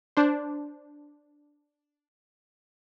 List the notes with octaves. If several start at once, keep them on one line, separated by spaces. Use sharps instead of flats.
D4 C5